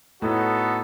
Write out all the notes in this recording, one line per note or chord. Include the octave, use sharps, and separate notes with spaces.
A2 B3 D#4 F#4 A4